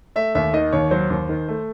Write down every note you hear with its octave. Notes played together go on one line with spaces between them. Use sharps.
A3 E5
D#2 E5
D#3 D#5
D#2 C#5
F#3 C5
D#2
D#3
A3